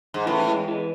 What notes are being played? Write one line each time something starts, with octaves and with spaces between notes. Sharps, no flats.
G#2
A2 C#3 E3
E3 G#3
E3 G#3